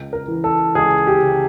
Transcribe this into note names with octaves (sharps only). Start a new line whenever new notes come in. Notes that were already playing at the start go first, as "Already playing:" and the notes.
Already playing: C#2
A#4
E3
A4
C#2 G#4
G4
C#3